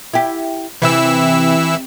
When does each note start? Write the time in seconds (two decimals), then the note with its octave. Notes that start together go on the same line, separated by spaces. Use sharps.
0.13 E4 G4
0.82 C3 E3 E4 E6